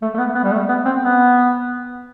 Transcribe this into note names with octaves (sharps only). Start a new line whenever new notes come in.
A3
A3
B3
B3
G3
A3
B3
C4
B3